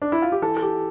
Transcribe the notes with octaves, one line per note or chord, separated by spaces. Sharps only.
D4
E4
F4
G4
E3 A4
A4
G4